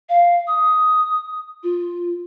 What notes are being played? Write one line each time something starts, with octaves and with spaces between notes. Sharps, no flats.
F5
D#6
F4